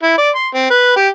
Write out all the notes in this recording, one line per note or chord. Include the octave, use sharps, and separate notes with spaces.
E4
D5
C6
C4
B4
G4